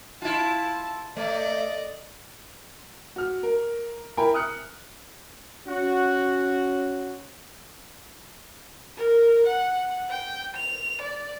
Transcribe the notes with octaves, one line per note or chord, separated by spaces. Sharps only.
E4 F4 A5
A3 D5 D#5
F#4 F6
A#4
E4 A#4 G5 G#5 A#5 B5
D#6 F6 F#6 C#7
C#4 F#4
A#4
F#5
G5
F7
D5